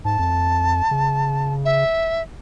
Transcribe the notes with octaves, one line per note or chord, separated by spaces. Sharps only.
G#2 A5
F2
C#3
E5